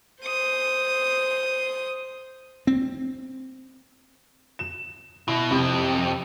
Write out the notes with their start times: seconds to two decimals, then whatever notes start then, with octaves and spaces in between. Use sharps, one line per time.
0.23 C5 D#6
2.67 C4
4.59 E7
5.28 B2 E4
5.51 F2 C3